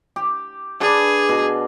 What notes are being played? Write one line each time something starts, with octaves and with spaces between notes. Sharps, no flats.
G4
D4 G#4 B4
B2